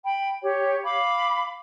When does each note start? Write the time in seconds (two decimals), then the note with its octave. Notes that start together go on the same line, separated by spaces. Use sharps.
0.05 G5 B5
0.42 G4 C#5
0.84 F5 B5 D6